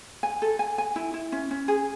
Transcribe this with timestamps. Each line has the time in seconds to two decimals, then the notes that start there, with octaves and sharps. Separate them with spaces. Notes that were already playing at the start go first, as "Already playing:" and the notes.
0.23 G#5
0.42 A4
0.59 G#5
0.78 G#5
0.96 E4
1.14 E4
1.32 C#4
1.51 C#4
1.68 G#4